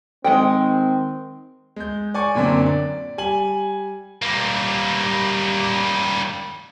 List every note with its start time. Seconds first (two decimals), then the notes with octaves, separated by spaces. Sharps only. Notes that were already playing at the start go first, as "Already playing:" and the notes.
0.24 D#3 G#3 C4 F#5 G5
1.76 G#3 G6
2.14 D5 G#5 C#6
2.35 F#2 A#2 D3 C4 D4
2.66 D5
3.18 G3 G#5 F#7
4.22 G3 A#3